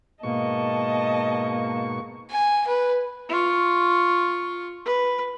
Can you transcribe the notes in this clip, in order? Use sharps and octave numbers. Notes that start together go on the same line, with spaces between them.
G#2 B2 A#3 D#5 A5 C#6
G#5
B4
F4 C#6
B4